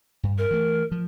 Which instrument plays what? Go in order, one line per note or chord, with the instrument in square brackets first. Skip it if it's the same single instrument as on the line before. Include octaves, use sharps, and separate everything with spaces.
[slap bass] G2
[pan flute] A#4
[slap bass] E3 A3
F3